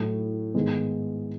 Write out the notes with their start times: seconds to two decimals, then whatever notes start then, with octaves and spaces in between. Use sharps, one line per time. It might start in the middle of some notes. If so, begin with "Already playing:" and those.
Already playing: A2 F#3 A3
0.54 G#2 D#3 G#3 B3